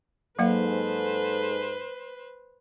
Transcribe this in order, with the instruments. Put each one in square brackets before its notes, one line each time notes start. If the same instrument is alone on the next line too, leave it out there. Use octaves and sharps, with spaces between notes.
[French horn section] G#2 A4 [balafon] F#3 A#3 F5 [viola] B4 C5